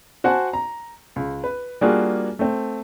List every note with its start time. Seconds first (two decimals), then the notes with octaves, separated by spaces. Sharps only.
0.24 F#4 C5 F#5 G#5 A5
0.53 A#5
1.16 C#2
1.44 B4
1.81 G3 A#3 D4 F4 F#4 G#4
2.39 A3 C4